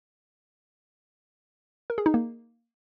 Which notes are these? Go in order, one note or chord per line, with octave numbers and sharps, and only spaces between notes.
A#4
G#4
D#4
A#3